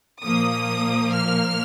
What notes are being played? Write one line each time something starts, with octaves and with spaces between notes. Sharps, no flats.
A#2 F3 A#3 D#6
F6